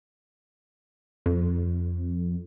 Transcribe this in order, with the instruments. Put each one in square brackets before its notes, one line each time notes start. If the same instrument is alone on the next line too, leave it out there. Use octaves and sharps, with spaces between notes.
[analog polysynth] F2